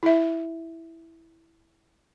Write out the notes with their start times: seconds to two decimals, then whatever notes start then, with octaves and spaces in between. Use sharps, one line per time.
0.03 E4 E5